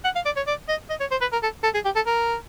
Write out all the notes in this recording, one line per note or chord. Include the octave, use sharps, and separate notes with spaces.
F#5
F5
D5
C#5
D5
D#5
D#5
C#5
C5
B4
A#4
A4
A4
G#4
G4
A4
A#4